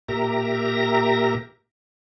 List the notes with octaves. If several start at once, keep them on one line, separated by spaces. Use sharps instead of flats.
A#2 G4 A#4 E5 A#5 A#6